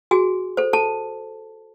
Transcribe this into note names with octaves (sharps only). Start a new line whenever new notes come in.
F#4 G#4 G#5
A4 C5
A4 A5